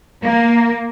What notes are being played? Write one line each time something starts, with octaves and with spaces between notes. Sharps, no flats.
A#3